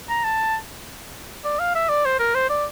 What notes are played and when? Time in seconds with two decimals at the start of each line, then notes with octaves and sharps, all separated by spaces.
0.09 A#5
0.24 A5
1.45 D5
1.59 F5
1.75 E5
1.89 D5
2.05 C5
2.19 A#4
2.35 C5
2.50 D5